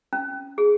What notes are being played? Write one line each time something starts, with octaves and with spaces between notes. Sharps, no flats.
C#4
G#4